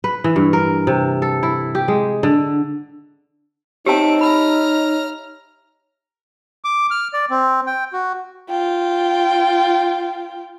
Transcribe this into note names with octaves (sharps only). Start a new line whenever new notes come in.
B4
E3
G2
A#4
C3
A4
E4
G4
G#3
D3
C4 D#4 G4 C#5 E5 A5 D7
A#5 B5 F6
D6
F6
D5
C4
G5
F#4
F4 G5